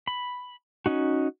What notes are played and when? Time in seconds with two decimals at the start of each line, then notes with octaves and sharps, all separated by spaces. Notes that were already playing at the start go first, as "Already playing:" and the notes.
0.07 B5
0.86 C#4 D#4 F#4